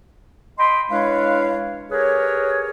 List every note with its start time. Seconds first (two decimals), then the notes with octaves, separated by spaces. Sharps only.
0.57 D#5 G5 B5 C6
0.90 G#3 D4 E4 B4 C#5 F5
1.90 G4 G#4 A#4 B4 C#5